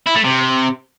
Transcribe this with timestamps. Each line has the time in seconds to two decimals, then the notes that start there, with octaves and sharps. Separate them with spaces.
0.07 E4
0.16 A3
0.25 C3